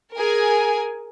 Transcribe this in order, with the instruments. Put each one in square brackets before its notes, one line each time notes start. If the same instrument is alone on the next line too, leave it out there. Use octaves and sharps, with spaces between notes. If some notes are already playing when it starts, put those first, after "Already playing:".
[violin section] G#4 A#4 G#5